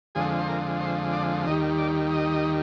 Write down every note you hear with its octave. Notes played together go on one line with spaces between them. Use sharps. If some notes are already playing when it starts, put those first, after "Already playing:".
F2 D3 F3 G#3 G#4
C5
A#4
C5
D5
D#2 D#3 G3 D#5
D5
D#5